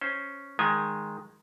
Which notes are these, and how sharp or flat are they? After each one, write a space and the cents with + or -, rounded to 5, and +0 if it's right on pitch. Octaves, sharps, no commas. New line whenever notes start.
C#4 +0 C5 +0
D#3 +0 G#3 +0 G#5 -20